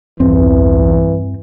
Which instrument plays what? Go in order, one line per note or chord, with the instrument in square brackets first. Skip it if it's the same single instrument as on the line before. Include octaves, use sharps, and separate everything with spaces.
[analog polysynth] B1 E2 [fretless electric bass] G2 C4 [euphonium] E3